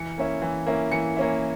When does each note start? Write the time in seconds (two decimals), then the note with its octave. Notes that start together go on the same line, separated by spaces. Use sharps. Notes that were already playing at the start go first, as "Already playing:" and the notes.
Already playing: E3 C#7
0.18 A#3 C#4 E4
0.42 E3
0.66 A#3 C#4 E4
0.92 E3 C#7
1.16 A#3 C#4 E4